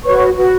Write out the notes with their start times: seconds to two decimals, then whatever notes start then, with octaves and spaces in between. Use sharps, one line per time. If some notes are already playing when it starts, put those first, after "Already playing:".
0.04 F#4 B4 C#5 C#6
0.37 F#4 B4